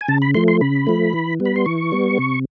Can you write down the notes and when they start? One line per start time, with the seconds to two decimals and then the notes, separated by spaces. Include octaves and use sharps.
0.01 G#5
0.08 C#3 A5
0.22 B5
0.34 F3 A3 C6
0.48 C6
0.61 C#3 B5
0.87 F3 A3
1.13 E3
1.40 G3 B3
1.45 B5
1.56 C6
1.66 E3 C#6
1.92 G3 B3
2.19 C3